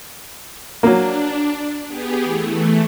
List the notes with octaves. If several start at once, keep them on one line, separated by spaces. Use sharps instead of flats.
F#3 A#3 D4
B3 G4 G#4
E3 A3